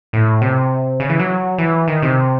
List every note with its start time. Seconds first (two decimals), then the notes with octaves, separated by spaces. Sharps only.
0.13 A2
0.42 C3
1.00 C#3
1.09 E3
1.20 F#3
1.58 E3
1.88 D#3
2.02 C3